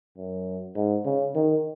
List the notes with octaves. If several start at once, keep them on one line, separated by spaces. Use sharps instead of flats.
F#2
G#2
C#3
D#3